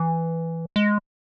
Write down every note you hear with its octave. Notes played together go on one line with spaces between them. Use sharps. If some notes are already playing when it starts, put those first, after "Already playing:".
Already playing: E3
G#3